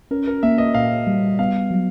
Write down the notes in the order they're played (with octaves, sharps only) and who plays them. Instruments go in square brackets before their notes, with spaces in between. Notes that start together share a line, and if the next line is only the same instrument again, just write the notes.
[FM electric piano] C#4 [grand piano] A#4
[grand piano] A#4
[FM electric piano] A#3 [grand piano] E5
[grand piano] D#5
[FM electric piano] A#2 [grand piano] F5
[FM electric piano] G3
[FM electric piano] B3 [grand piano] F5
[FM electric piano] F#3